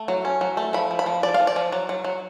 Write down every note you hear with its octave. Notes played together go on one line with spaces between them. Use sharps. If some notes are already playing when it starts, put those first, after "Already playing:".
Already playing: A3
F#3
C#4
F#3
A3
F3 B5
F3
B5
F3
F3 D5
F5
F3
D5
F3
F#3
F#3
F#3